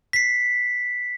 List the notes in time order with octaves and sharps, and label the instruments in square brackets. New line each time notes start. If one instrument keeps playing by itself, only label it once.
[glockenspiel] B6 C7